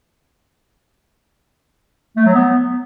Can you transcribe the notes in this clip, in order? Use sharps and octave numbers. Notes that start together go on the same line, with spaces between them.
A3
F#3
B3